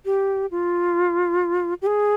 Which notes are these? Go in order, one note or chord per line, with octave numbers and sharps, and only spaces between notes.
G4
F4
G4
G#4